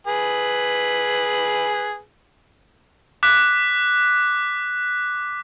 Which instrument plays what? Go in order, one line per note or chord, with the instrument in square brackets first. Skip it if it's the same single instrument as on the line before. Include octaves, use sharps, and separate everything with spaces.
[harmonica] G#4 B4
[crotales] D6 F#6 B6